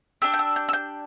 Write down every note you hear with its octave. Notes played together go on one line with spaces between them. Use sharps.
D4 G4 E6
G6
E6
G6
E6
G6